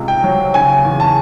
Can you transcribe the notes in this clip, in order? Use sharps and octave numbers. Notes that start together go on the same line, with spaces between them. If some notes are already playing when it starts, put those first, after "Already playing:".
Already playing: C#2 C3
G5
F#3
C#3 G#5
E2
A5